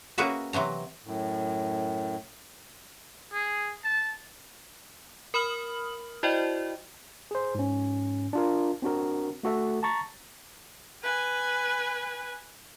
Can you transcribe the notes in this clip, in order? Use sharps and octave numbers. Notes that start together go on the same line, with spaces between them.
A#3 C#4 F#4 G#4 B4 E5
C3 E3 F#3 A#5
F#2 A2
G#4
A5
A#4 B5 D#6 F6 F#7
E4 F#4 C5 D5 D#5 G5
G#4 C5
G#2 C#4
D4 F4 A#4
C4 D4 F#4 A#4
A3 F#4 A4 E5
A5 A#5 C#6 A6
B4 G#5